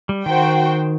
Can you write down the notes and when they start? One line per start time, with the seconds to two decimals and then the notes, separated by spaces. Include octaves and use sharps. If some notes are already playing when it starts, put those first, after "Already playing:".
0.09 G3
0.26 D#3 F#4 C5 G5